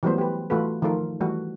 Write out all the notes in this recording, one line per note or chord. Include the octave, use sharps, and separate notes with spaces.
E3 F#3 G3 A3 B3 C5
G4 B4
E3 A3 F4 F#4 A4 B4
D#3 F3 A3 F4 A4 A#4
E3 G3 A3 F#4